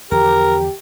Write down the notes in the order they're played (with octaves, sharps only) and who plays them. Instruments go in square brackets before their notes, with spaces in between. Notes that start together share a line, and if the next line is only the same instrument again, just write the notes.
[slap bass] E2 D3 F3 [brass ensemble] G4 [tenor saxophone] A#4 [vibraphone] A#5